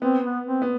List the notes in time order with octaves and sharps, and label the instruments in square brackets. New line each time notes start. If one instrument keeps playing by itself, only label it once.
[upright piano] B3 [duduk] C4
[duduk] B3
C4
[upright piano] B3